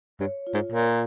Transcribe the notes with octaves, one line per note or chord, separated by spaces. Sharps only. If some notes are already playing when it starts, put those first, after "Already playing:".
G2 C#5
F4
G#2
A#2 A#4